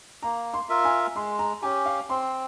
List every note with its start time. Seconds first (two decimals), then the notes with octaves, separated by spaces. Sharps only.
0.23 A#3 A#5
0.54 C6
0.69 F4 A#4 E5
0.85 G#5
1.16 G#3 C6
1.39 A#5
1.62 C#4 G4 G#5
1.86 F5
2.09 C4 C6